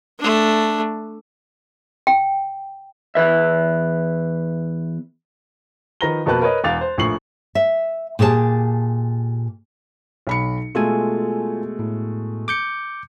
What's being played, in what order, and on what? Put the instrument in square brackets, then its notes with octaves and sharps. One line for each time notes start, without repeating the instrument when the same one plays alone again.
[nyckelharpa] A3 D4
[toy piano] G5
[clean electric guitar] E2 B4 E5
[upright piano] D#3 F3 B4 A#5 A#6 G7
F2 B2 A#3 B4 A5 F#6
A#4 B4 C#5 D#5
E1 E2 F5 D6 A6 F7
C5
A#1 A2 F3 C#6 C7 F#7
[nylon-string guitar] E5
A#2 G4 G#4 B4 A5
[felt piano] B1 B5 C#7
[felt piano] B2 G#3 A3 [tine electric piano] F4 A4 G#5
[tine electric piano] A2
D6 G6 C#7